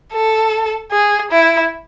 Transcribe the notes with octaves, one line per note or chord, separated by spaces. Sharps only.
A4
G#4
E4